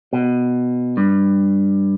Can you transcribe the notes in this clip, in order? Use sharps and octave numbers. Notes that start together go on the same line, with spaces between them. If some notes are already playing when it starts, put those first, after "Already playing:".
B2
G2